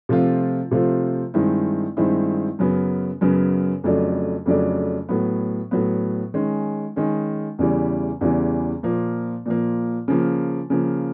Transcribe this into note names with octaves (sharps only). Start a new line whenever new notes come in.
C3 F3 A3 C4 F4
C3 F3 A3 C4 F4
G2 D#3 G#3 C4 E4
G2 D#3 G#3 C4 E4
F#2 C#3 F#3 B3
F#2 C#3 F#3 B3
F2 C#3 F#3 A3 D4
F2 C#3 F#3 A3 D4
A2 F#3 B3
A2 F#3 B3
D#3 G#3 C#4
D#3 G#3 C#4
E2 C#3 E3 G3
E2 C#3 E3 G3
A#2 F3 A#3
A#2 F3 A#3
C#3 F3 A#3
C#3 F3 A#3